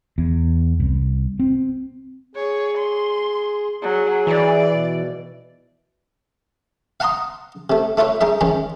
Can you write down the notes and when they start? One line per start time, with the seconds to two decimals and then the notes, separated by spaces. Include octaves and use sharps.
0.18 E2
0.80 C2
1.39 C4
2.35 G#4 C#5
2.78 C6
3.82 F#3 G#4
4.27 E3 D5
4.70 B2
7.00 F5 F#5 A5 A#5 C6 D#6
7.70 C3 A3
7.97 A3 E4 F4 B4 C#5
8.21 G#3 D#4 A#4 E5
8.41 D#3 E3 G#3 C#4